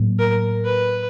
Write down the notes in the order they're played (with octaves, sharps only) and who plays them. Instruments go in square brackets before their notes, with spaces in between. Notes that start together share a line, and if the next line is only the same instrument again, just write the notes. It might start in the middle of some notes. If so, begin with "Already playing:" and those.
Already playing: [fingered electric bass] A2 F#3 A#3
[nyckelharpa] A#4
B4